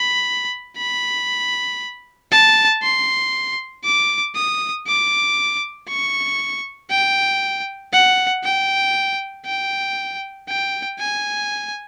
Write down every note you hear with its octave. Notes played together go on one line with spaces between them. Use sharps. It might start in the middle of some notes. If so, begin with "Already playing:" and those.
Already playing: B5
B5
A5
C6
D6
D#6
D6
C#6
G5
F#5
G5
G5
G5
G#5